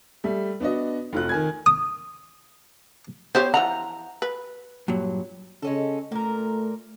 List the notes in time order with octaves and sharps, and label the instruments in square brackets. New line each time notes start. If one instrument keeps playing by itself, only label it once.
[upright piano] G3 A3
B3 D4 F#4 D#5
F1 F4 F#6
D#3 G#5 G#6
[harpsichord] D#6
[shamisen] B3 G4 C#5 [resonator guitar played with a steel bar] C5
[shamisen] E3 F3 F#5 [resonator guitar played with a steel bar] A#5
[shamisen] B4
[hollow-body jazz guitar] G2 A#2 F#3
[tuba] C#3 [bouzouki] G#3 C#4 A4
[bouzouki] A#2 A#4 [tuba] A3